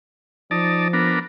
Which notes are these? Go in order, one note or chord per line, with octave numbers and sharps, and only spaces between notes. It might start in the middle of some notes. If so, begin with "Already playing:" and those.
F3 D#4 D5 A5
B3 D4 A#4